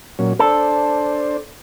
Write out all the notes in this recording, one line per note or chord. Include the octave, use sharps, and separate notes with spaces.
A#2 F#3 C#4
D4 A4 C5